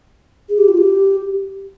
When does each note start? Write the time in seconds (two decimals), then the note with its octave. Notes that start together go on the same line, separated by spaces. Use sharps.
0.49 G#4
0.58 G4
0.68 F4
0.78 G4